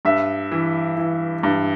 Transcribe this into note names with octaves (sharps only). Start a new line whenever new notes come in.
G2 E5
E3
E3
G2